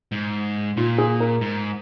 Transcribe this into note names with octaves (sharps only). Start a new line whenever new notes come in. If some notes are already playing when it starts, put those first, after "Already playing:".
G#2
A#2 F4
G#4
A#4
G#2